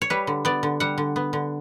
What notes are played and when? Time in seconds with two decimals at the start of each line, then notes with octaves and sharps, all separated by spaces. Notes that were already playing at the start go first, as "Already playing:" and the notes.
0.02 C#5
0.10 G3 B4
0.27 D3
0.45 B3 D5
0.63 D3
0.80 G3 F#5
0.98 D3
1.16 B3
1.33 D3